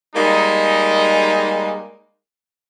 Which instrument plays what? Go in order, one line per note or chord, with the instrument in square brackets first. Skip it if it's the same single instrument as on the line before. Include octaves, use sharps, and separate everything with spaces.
[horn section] G3 G#3 A#3 D#4